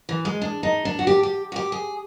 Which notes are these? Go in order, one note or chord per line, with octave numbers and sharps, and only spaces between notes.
E3
G#3
D4
D#4
D4
F#4
G4
G4
F#4
G4
G#4